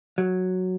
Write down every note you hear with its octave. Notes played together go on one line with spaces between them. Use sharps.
F#3